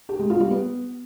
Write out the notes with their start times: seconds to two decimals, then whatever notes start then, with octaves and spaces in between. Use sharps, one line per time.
0.09 G4
0.19 G#3
0.30 F4
0.41 G3
0.51 B3